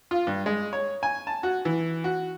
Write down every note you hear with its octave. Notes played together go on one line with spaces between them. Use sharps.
F4
G2
G#3
C#5
G#5
A5
F#4
E3
F#4